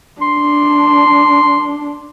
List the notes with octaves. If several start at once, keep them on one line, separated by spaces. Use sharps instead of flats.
D4 C6